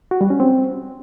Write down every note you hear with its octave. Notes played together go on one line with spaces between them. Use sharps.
F#4
G3
C#4
C4